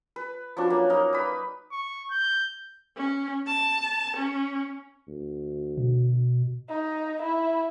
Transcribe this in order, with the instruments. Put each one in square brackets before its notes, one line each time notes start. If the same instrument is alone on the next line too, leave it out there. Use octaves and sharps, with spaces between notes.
[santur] B4
F3 F#3 C#4 D4
A#3
D#4 A#4
B4 B5
[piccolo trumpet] C#6
G6
[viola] C#4
A5
C#4
[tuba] D2
[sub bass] B2
[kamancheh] D#4
E4